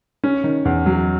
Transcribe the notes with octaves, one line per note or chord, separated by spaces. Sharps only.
C#4
D#3
E2
F#3